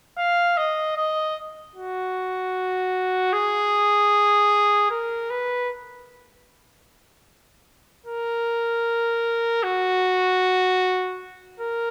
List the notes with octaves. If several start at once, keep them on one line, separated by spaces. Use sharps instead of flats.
F5
D#5
D#5
F#4
G#4
A#4
B4
A#4
F#4
A#4